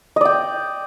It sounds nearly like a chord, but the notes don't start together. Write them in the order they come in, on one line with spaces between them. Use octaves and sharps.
D#5 D5 G5